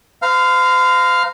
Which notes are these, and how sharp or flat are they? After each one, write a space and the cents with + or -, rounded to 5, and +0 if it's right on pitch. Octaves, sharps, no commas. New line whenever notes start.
C5 -40 F5 +0 A#5 +0